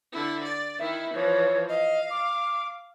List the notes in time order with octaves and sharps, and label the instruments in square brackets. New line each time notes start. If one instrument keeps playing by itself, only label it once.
[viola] D3 E4
D5
[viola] D#3 E4 [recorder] E5
[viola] E3 F3 [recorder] C#5
[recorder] D#5 [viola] F5
[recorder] D6